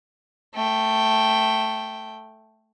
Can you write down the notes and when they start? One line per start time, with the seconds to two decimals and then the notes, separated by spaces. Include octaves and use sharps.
0.55 A3 G5